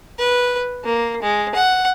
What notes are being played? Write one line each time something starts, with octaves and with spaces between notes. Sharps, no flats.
B4
A#3
G#3
F#5